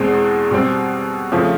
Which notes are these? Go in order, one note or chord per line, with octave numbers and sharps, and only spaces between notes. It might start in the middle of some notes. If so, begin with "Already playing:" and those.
Already playing: E2 B2 G#3 C4
B2 G3 C4
F2 C#3 F3 A3